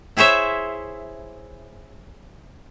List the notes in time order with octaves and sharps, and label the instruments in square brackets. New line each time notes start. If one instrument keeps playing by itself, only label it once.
[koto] E4 G#4 C5 C#5 E5